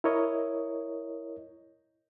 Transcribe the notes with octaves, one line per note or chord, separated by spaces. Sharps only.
E4 A#4 C#5 D#5